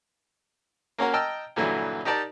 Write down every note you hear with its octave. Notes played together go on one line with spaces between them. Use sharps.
A#3 C#4 F#4 A#4
D#5 G5 A5 A#5 E6 F6
G2 A#2 D3 E3 F#3
D#4 G4 A#4 D5 A5